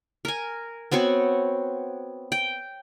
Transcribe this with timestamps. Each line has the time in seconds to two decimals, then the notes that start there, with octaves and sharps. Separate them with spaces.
0.25 A#4 G#5
0.92 B3 C4 F#4 C#5
2.32 G5